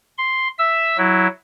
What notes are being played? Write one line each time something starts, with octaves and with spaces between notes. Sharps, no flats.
C6
E5 E6
F#3 E4